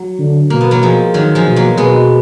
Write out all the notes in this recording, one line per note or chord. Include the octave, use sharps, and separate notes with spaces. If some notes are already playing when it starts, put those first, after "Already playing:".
Already playing: F#3
D3
B2 A#3
B3
F#3 A#3
F3 G#3
D#3 F#3
F3 G#3
B2
F#3 A#3
B2 G#3 B3